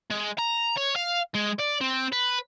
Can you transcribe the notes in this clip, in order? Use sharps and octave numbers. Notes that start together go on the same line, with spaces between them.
G#3
A#5
C#5
F5
G#3
D5
C4
B4